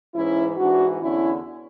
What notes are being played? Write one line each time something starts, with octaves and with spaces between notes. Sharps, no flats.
G#2 E3 C#4 E4
G#2 E3 D4 F#4
E2 D3 C#4 E4